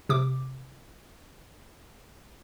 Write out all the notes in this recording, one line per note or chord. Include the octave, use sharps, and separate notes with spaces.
C3 D6